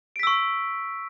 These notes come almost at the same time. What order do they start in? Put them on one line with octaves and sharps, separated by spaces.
D7 B6 E6 C#6